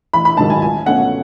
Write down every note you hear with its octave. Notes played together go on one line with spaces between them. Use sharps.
A1 B5
B5
G#2 D#3 F#3 A5
G#5
C#2 G#5
B2 A3 C#4 F#5